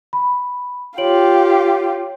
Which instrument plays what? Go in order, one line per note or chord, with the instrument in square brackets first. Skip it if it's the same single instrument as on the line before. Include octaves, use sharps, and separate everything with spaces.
[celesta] B5
[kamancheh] F4 G4 [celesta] C#5 D7 F#7